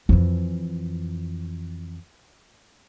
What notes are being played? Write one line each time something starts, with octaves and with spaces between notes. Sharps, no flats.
F2 E3